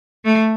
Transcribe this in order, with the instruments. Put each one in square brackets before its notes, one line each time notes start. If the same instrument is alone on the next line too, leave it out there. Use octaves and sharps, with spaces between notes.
[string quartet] A3